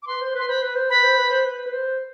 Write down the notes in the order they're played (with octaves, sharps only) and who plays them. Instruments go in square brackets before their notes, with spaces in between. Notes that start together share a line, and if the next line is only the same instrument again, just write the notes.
[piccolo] D6
[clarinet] B4 [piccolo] C6
[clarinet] C5
[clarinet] B4 [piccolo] C6
[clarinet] C5 [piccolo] B5
[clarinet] B4
C5
[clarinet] B4 [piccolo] B5
[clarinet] C5
B4
C5
B4
B4
C5